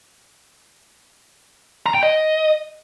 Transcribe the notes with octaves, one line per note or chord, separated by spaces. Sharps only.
A#5
G5
D#5